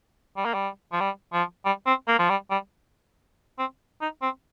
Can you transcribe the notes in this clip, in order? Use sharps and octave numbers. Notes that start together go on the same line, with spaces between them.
G3
A#3
G3
F3
G3
F3
G3
C4
A#3
F3
G3
G3
C4
D#4
C4